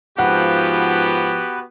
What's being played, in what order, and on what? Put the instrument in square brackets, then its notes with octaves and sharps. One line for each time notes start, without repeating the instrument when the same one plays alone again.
[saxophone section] G#2 F3 [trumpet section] B3 F#4 G4 [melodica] B4 [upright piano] F#5